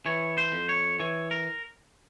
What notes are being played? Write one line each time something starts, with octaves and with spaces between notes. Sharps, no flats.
E3 C#5
C5
F2
C#5
E3 C#5
A#4